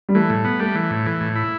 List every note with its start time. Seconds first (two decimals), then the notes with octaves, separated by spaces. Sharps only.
0.09 G3
0.15 E3 A3
0.30 A2
0.45 B3
0.60 G3 A3
0.75 E3
0.91 A2
1.06 E3
1.20 A2
1.36 E4